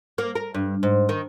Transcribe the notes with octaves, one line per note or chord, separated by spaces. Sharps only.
A#3
A#4
G2
G#2
D#3